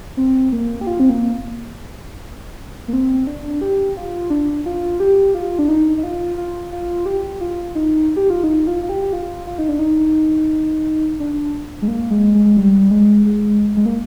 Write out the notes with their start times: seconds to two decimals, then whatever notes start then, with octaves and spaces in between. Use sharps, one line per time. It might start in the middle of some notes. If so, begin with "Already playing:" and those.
0.17 C4
0.52 A#3
0.81 G4
0.87 F4
1.00 C4
1.10 A#3
2.88 A#3
2.93 C4
3.27 D4
3.61 G4
3.97 F4
4.30 D4
4.66 F4
5.00 G4
5.35 F4
5.59 D4
5.69 D#4
5.98 D#4
6.03 F4
6.37 F4
6.72 F4
7.06 G4
7.41 F4
7.75 D#4
8.16 G4
8.30 F4
8.44 D#4
8.67 F4
8.83 F4
8.89 G4
9.02 G4
9.13 F4
9.47 F4
9.59 D#4
9.69 D4
9.79 D#4
11.20 D4
11.82 G#3
11.88 A#3
12.11 G#3
12.35 G#3
12.46 G#3
12.57 G3
12.91 G#3
13.26 G#3
13.77 G#3
13.86 A#3